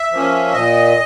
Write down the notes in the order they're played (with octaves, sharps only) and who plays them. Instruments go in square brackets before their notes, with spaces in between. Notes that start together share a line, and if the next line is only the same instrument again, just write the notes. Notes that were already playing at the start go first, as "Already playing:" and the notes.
Already playing: [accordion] E5
F3 A#3 C#4
A#2 D#5